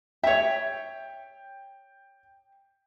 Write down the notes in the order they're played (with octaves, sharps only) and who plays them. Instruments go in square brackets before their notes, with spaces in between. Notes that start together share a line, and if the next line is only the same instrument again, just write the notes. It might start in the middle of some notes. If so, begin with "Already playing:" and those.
[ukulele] C#5 E5 [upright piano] G5